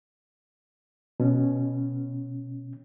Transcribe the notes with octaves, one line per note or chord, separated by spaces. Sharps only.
B2 C#4